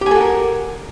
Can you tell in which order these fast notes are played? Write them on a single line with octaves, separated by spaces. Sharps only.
G4 G#5 A4 F#4 A#4